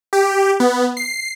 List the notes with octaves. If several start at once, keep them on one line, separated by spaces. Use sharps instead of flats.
G4
B3
C7